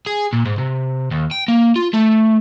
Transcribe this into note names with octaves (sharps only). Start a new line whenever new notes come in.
G#4
A#2
G#2
C3
D#2
G5
A#3
F4
A3